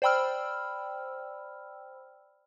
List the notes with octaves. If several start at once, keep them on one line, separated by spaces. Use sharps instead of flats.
C5 D5 G5 B5 E6 F6